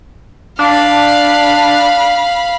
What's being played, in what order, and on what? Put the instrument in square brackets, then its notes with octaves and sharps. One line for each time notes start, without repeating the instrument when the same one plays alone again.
[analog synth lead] D4 [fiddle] F5 B5